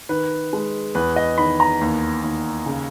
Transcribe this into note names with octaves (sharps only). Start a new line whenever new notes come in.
D#3 B4
G#3
E2 B4
D#5
D#3 B5
A#5
D#2
D#2
C#3